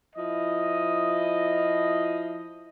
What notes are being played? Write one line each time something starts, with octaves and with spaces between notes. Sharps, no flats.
F3 E4 D#5